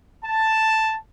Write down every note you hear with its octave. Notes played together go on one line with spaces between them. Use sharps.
A5